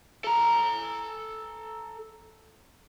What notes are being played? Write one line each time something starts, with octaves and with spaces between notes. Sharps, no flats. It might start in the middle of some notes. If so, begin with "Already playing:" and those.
A4 A#5